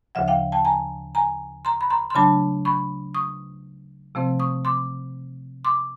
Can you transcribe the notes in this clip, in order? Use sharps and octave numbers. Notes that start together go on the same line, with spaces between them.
D2 C#3 F3 E5 F#5
F5 G5
G5 A5
G#5 A#5
G#5 A#5
A#5 C6
B5
A#5 C6
C6
C#3 F#3 A3 D4 A5 B5
B5 C#6
C#6 D#6
C3 F3 A3 C4
C#6 D#6
C6 D6
C6 D6